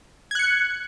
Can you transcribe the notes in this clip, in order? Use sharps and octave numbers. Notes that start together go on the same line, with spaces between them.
F#6 G#6 C#7